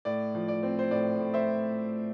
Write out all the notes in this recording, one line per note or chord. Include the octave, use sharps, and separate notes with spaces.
A2 D5
F3
D5
C4
C5
A2 D5
A2
C5 E5